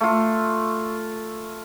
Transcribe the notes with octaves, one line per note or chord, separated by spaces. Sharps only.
A3 F4